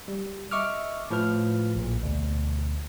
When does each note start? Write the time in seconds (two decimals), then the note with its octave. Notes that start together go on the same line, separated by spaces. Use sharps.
0.08 G3
0.51 D#5 E5 C#6 D6 E6 F6
1.11 A2 F3 F4 B4 F6
1.75 A#1 A#2
2.03 D2 B2